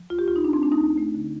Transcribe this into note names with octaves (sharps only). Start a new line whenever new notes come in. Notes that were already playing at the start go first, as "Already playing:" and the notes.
Already playing: F3
D2 F4
G4
D2 F4
D#4
D2 D4
C4
A3 D4
D#4
D2
A3
D3